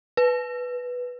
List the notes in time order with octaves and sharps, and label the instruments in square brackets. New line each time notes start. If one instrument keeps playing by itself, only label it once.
[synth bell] B4